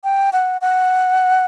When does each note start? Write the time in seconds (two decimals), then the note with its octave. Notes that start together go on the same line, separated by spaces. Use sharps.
0.04 G5
0.33 F#5
0.61 F#5